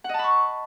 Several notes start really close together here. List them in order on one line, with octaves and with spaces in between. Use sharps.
F#5 D#5 A5 B5 C#6